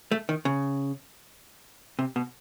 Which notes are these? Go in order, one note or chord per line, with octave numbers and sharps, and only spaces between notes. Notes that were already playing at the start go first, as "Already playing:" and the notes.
A3
D#3
C#3
C3
B2